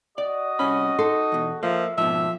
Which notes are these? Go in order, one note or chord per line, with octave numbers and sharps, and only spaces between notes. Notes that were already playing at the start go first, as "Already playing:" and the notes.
F#4 D5 D#5
C2 C#4 B5
D#4 A4 C6
E2 B2
F3 A#3 D#5 E5
G#2 B2 F3 C4 D4 E5